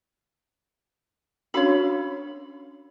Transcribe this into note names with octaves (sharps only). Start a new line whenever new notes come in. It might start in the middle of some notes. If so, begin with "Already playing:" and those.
C#4 D4 F#4 C#5 F5 B5